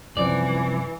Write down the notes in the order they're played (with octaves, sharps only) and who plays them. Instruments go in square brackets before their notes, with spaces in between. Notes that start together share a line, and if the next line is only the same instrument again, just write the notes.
[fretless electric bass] C2 F#2 [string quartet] E3 [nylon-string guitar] F3 C4 [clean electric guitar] D5